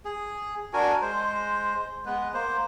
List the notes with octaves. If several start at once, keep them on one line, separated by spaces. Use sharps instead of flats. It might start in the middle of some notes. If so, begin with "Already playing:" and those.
G#4
D4 F#4 A#4 G#5
G#3 C5
G#3 B3 B4
A#3 C5